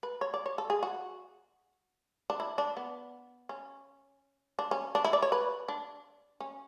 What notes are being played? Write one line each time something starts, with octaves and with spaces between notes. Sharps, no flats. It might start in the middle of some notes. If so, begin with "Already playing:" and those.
B4
C#5
D5
C#5
A4
G#4
F#4
D4
E4
D4
B3
C#4
D4
C#4
D4
E4
D5
C#5
B4
D4
C#4